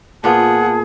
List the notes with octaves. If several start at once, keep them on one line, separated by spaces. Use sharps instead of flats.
A#2 B3 F4 G#4 F#5 A5